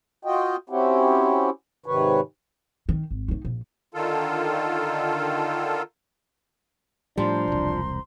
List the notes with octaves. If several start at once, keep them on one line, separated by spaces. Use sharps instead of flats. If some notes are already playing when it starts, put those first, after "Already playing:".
F4 F#4 D#5 G5
C4 C#4 E4 F#4 G4
G#2 C3 D#3 B4 C#5
D#3
G#1
A3 D#4
A#1
D3 D#3 F4 A4
A2 F3 G3 D4 C5 A#5 C6
E1 C2